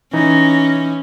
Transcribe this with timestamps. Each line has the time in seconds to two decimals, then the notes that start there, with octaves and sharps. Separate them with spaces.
0.13 E3 C#4 D#4 A#6